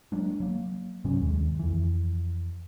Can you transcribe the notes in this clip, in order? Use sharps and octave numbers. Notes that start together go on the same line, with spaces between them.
F#3 G#3 A#3 D4
F#3 A#3
G2 C3 F#3 C#4
D#2 G#3
F2 E3